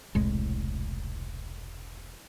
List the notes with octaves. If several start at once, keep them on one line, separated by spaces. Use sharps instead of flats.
E1 C2 A2 G#3